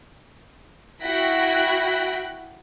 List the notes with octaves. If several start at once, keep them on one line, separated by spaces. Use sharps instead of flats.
E4 F#4 G5 F#6 A#6 B6